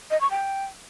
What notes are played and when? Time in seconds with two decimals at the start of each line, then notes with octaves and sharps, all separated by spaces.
0.11 D#5
0.21 C#6
0.31 G5